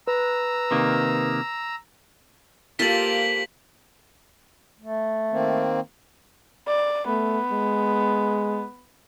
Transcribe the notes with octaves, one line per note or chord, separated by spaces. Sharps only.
B4 A#5 E6
C3 D#3 A#3
A#3 F4 G4 A4 C5 B6 F#7
A3
D#3 A#3 C4
D5
A3 B3
G#3